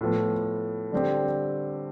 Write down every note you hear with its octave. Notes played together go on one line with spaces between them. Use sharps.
A2 F3 B3
D3 G3 C4 G4